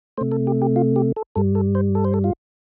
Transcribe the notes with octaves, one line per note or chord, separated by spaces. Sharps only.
C3 A3 C5
A4
G4
G4
F4
G4
A4
G2 G3 A4
A4
C5
A4
C5
A4
F4